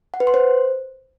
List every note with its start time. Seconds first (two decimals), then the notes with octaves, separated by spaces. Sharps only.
0.14 F#5
0.20 B4
0.27 C6
0.34 C5